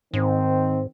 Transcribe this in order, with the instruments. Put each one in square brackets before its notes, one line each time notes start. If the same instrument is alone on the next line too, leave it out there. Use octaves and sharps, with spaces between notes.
[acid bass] G#2 [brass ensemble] D#3 C4